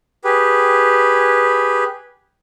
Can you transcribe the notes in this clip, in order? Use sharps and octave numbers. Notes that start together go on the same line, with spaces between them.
G4 G#4 B4